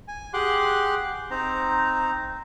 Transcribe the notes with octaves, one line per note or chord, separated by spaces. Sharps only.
G#5
G4 G#4 F#5 C6 D6 F#6
C4 D#4 C5 A#5